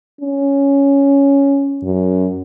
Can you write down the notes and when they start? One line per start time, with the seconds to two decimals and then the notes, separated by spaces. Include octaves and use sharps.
0.21 C#4
1.83 F#2